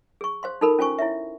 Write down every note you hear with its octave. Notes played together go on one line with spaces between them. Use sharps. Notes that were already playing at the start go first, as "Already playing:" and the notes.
G#4 C#6
C5 F5 C6
D#4 F4 A4 A#4 B5
C#4 F4 C5 G#5 C#6
E4 C#5 E5